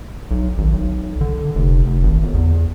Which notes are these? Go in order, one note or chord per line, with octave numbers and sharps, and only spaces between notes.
B1
G#1
B1
D3
F1
F1
G#1
G1
E2